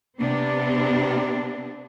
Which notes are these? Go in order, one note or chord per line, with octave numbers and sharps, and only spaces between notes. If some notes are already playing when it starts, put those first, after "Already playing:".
C3 B3 C4 D4